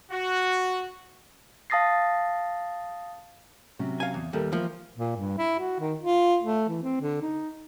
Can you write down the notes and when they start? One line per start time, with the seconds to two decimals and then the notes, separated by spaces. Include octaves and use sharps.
0.11 F#4
1.70 F5 A5 D#6 A6 A#6 C7
3.79 C3 F#3 C#4
4.00 F5 G#5
4.14 E2
4.33 D#2 G3 E4 A4 A#4
4.53 E3 F3 A#3 B3
4.97 A#2
5.17 G2
5.38 E4
5.59 F#4
5.80 D#3
6.00 F4
6.43 A3
6.69 E3
6.83 C4
7.01 D3
7.21 D#4